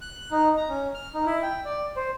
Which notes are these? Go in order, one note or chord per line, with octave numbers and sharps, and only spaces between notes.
F#6
D#4
A#5
C#4
F6
D#4
E4
G5
D5
C5